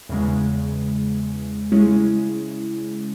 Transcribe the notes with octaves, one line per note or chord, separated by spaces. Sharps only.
E2 C#3 G#3
C#3 G#3 C#4 E4